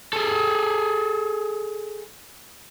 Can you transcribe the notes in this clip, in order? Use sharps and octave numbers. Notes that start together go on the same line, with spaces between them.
G#4 A4